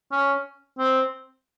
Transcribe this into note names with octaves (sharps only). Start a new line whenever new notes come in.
C#4
C4